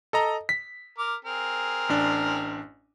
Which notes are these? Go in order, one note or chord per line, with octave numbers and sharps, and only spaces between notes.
A4 D#5 A#5
B6
A#4 D6
C4 G#4 A#4
A1 D4